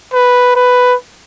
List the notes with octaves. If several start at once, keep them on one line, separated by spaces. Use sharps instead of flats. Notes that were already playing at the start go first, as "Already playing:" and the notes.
B4
B4